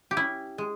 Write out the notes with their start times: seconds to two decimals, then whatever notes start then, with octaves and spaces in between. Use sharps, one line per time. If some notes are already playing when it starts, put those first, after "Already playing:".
0.11 G4
0.16 C#4 E4
0.58 G#3